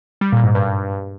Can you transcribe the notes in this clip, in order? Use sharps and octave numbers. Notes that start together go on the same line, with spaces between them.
G3
A#2
G#2
G2